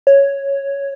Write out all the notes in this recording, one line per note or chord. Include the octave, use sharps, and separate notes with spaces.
C#5